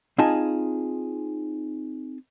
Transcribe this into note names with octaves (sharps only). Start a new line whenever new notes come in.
C4 D#4 F4 G#4 G#5 A5